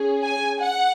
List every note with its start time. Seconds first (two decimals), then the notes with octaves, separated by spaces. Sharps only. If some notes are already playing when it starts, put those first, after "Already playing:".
Already playing: C#4 G#4
0.25 G#5
0.61 F#5